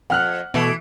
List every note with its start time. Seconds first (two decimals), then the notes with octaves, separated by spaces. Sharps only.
0.10 F2 F#5 F6 F#6
0.54 B2 E3 A3